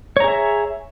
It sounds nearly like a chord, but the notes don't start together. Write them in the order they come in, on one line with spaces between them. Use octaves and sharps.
C#5 A#5 G#4 E5